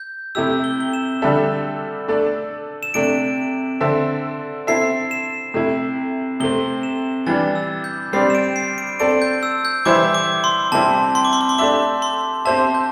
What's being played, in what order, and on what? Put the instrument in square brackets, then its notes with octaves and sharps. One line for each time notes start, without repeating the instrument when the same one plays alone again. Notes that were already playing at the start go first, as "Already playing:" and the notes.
Already playing: [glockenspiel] G6
[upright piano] C3 A3 E4 G4 [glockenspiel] E6
[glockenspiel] G7
G7
E7
[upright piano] D3 G3 D4 A4 E5
A3 D4 A4 D5
[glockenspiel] E7
[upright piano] C3 A3 D4 [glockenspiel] D7
[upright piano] D3 C4 A4 E5
[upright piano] C4 E4 A4 E5 [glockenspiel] C7
[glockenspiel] E7
[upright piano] C3 A3 E4
[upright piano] C3 A3 C4 [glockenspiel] G7
[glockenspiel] E7
[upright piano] E3 G3 D4 [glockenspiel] A6
[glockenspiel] E6
G6
[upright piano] G3 C4 G4 D5 [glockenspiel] C7
[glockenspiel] E7
D7
C7
D7
[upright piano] C4 A4 D5 [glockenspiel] D7
[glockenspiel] G6
E6
G6
[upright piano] E3 G3 E4 C5 E5 [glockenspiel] D6
[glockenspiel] D6
C6
[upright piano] C3 G3 C4 E4 [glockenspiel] A5
[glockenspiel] C6
D6
C6
D6
C6
[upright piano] A3 D4 G4 E5 [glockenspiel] D6
[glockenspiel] C6
[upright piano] C4 G4 C5 E5 [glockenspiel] A5
[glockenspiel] G6